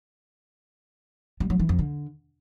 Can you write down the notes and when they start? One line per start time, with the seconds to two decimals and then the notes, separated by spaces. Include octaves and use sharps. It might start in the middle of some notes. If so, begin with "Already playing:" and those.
1.40 G3
1.50 F#3
1.60 E3
1.69 F2
1.79 D3